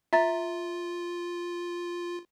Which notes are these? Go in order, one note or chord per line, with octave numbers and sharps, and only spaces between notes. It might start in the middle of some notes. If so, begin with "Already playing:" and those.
F4 E5 A#5 A6